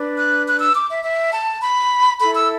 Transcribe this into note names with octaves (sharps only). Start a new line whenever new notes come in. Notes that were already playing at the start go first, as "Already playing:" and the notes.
Already playing: D4 B4
F#6
F#6
E6
D6
E5
E5
A5
B5
E4 A4 B5
E6